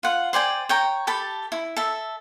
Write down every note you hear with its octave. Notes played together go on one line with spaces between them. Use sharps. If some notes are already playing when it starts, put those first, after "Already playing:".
F4 F#5
C5 D5 G5 G#5
C#5 G5 A#5
G4 A4 A5 B5
E4
A4 E5